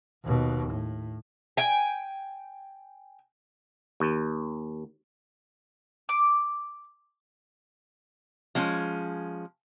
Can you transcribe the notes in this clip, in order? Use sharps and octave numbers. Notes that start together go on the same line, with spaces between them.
D#2 B2
A2
G5 G#5
D#2
D6
F3 G#3 C#4